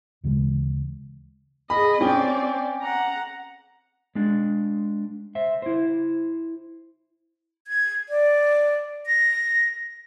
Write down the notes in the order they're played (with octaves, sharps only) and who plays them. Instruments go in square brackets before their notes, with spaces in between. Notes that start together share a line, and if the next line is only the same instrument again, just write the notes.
[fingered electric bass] D2 C#3 E3 G#3
[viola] G#4 D#5 [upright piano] B5
[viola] C4 D5 [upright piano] C#4 G5
[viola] F#5 A#5
[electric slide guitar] G#3 D4
C5 E5
E4 C5
[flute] G#6
D5
A#6